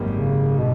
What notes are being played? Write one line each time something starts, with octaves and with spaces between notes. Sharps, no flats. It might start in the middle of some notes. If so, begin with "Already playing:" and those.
Already playing: G#1 F#2 D#3 G3 A#3
C#3
B2